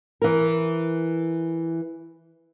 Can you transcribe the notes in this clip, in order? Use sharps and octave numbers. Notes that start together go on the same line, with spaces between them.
E3 A#4